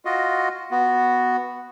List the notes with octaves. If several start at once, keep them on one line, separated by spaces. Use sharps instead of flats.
F4 F#4 D#5
B3 F#4